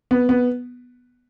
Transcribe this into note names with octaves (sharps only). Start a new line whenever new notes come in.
B3
B3